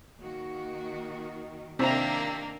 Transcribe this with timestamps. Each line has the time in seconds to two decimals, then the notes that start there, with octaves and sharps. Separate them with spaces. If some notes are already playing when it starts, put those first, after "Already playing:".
0.19 D#3 A#3 F#4
1.79 C3 D#3 A#3 C4 D4 E4 A#4 A#5